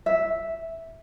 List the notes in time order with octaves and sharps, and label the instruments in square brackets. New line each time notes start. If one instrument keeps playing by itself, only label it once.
[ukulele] E5